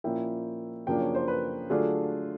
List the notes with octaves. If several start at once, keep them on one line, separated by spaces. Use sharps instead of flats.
A#2 F3 A#3 C#4 E4 G5
F#2 C#3 F3 A#3 D4 G5
C#5
C5
B4
D3 F#3 A3 D4 F4 G#4